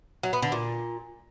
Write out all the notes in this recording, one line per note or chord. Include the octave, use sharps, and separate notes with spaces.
F#3
B3
D3
A#2